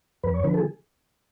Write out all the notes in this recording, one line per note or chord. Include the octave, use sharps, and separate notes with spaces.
F2 B4
C#5
D3 F3 B4
A4
G#4